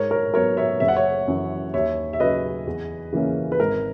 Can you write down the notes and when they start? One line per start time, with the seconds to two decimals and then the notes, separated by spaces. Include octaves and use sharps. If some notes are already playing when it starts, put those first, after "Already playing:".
Already playing: G#2 A#4 C#5
0.11 A#4 C#5
0.34 F#3 B3 A#4 C#5
0.57 C#5 E5
0.80 F#1 E5
0.88 F#5
0.96 C#5 E5
1.28 F#2 E3
1.74 D#2 C#5 E5
2.13 E5
2.19 C#3 F#3 B4 D#5
2.67 E2
3.12 C#3 E3 A#3 C#4
3.52 B4
3.60 G#1 A#4